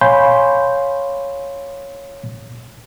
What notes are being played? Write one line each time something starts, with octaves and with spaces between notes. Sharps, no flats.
C#5 F5 G#5 B5 C6 G6